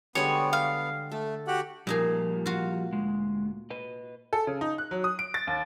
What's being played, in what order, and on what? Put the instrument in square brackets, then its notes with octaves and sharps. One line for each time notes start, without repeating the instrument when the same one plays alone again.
[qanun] D3 G3 G#3 [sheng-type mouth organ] B3 [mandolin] C#5
[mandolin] F5
[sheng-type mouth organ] A3 [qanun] A4
[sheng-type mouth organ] F#4 G4 F#5
[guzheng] A#2 D#4 G#4 [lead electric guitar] F3 G3
[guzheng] F4 F#4
[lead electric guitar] D2 G#3
B4 D#5
[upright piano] A4
C#3
D#4
F#6
F#3
D#6
D7
A6
D#2